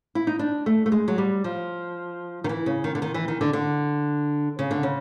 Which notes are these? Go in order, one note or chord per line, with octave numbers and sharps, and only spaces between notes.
E4
D#4
D4
A3
A3
G#3
F#3
G3
F3
D#3
E3
C#3
D#3
D3
D#3
E3
D#3
D3
D3
C#3
D3
C#3